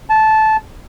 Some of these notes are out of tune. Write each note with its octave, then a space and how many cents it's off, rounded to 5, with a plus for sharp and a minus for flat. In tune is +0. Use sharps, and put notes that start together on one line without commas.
A5 -15